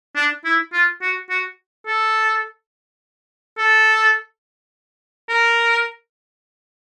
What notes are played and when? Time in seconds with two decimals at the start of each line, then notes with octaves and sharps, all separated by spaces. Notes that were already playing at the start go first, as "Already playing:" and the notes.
0.16 D4
0.45 E4
0.73 F4
1.02 F#4
1.30 F#4
1.87 A4
3.58 A4
5.29 A#4